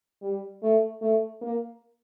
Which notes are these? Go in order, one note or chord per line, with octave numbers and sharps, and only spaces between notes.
G3
A3
A3
A#3